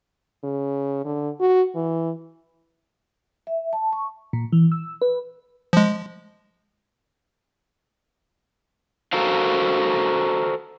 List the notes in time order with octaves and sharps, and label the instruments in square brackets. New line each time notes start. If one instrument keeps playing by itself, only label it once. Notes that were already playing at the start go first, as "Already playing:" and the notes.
[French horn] C#3
D3
F#4
E3
[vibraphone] E5
A5
C#6
[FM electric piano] A#2
E3
E6
B4
[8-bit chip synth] F3 G#3
[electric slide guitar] F#4 A4 A#4 C5 F5